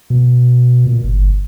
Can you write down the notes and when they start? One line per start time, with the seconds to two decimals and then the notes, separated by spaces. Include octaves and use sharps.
0.10 B2
0.86 A#2
1.04 G1